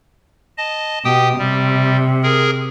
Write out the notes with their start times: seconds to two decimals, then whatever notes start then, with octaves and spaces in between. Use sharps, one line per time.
0.58 D#5 A5
1.05 B2 G4 G5 D#6
1.39 C3 G3
2.23 G#4 A#4